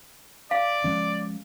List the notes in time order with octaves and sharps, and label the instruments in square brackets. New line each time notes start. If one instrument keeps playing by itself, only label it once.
[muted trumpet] D5 [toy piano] F5
[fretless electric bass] F3 G#3 C#4